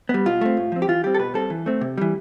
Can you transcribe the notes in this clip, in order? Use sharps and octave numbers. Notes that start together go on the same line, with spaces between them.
G3 B3
B2 F4
A3 C4
A2
F3 C4
G4
E3 F4
G3 C4 G4
A4
B2 B4
G3 C4 A4
E3
A3 C4
C3
E3 G3